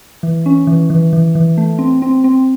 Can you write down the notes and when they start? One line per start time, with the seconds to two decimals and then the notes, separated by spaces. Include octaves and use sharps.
0.23 E3
0.46 C#4
0.67 E3
0.90 E3
1.13 E3
1.35 E3
1.57 A3
1.79 C4
2.02 C4
2.24 C4